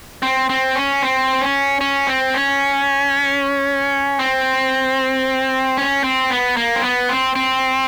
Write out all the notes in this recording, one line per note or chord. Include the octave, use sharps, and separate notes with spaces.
C4
C4
C#4
C4
C#4
C#4
C4
C#4
C4
C#4
C4
B3
A#3
C4
B3
C4
C4